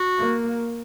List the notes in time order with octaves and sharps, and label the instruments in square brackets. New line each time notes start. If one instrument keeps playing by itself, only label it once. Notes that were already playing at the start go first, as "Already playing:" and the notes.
Already playing: [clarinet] F#4
[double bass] A#3